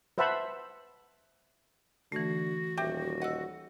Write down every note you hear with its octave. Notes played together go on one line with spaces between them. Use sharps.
B4 C5 E5 F#5 A5 B5
D3 E3 A3 F#4
D#1 G4 E5
D#5 F#5 E6